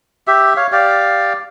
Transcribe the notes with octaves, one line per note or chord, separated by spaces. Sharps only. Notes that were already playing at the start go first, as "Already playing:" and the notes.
G4 E5
C#5 F5
G4 D5 F5